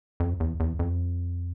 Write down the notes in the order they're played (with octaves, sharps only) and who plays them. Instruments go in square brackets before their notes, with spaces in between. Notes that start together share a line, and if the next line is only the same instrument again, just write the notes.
[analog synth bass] F2
E2
E2
F2